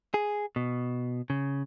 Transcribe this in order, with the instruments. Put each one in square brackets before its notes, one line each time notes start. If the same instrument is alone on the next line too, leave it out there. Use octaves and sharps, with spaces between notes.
[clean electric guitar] G#4
B2
C#3